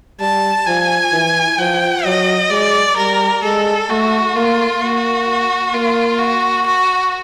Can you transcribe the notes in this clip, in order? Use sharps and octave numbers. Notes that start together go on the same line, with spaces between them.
G3 A5
F3 G#5
E3
F3 G5
F#3 D#5
G#3 D5
G3 A#4
G#3 A4
A3 F#4
A#3 F4
A#3 F#4
A#3 F4
F#4
F#4